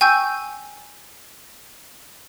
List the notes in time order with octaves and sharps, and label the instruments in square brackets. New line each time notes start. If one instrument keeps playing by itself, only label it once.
[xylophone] G5 G#5 C#6 E6 G6